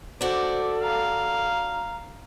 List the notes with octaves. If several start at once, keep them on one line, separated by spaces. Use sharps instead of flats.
D4 F#4 A4 C5 D6
F5 A#5